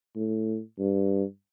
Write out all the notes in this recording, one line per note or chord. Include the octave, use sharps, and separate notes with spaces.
A2
G2